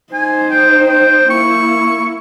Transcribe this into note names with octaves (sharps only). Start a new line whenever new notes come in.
D#4 C5 G#5
G5
G5
A#3 E4 C#6